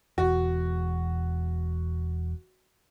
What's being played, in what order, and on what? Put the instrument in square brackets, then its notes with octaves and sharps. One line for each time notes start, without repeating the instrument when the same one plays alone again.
[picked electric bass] E1 E2 [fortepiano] F#4